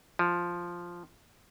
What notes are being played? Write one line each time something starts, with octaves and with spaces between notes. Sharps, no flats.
F3